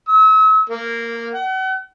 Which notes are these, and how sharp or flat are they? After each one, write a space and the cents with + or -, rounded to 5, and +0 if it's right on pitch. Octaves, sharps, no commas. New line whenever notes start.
E6 -40
A#3 -10
F#5 +40